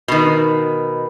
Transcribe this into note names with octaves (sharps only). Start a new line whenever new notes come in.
B2 D#3